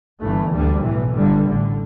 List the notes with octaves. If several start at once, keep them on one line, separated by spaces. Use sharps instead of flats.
G1 G2 E3 A3
D2 D3 G3
B1 A2 E3
G1 G2 D3 G3
A1 A2 D3